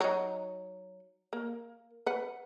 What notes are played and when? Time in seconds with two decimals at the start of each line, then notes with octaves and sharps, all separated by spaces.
0.01 F#3 D#4
1.33 A#3
2.06 B4 F#5